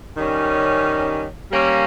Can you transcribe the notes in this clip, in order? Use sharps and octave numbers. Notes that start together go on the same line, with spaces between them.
D#3 G3 C#4
G3 A#3 C#4